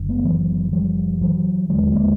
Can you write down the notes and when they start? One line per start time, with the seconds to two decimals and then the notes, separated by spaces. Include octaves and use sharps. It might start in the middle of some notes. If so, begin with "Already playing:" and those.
Already playing: F#1 D3
0.09 A3 B3
0.25 E3 F#3
0.73 F3 G3
1.21 E3 F#3
1.69 E1 D#2 D3 F#3 G#3
1.93 G#3 A#3